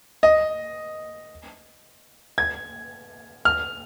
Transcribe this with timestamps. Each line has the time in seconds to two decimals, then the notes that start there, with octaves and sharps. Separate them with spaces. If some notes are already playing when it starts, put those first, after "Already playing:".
0.23 D#5
2.38 G#6
3.45 F6